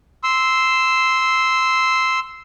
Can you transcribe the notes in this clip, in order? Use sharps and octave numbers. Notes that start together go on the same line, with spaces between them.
C6 E6